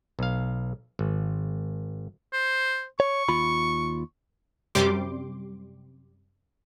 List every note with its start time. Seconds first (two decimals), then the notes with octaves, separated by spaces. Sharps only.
0.19 B1 F5
0.99 G#1
2.33 C5
3.00 C#5 C#6
3.29 D#2 F4 B5
4.75 F#2 C3 G3 G4 C6 D6